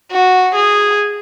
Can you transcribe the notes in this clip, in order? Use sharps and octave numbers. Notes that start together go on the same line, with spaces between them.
F#4
G#4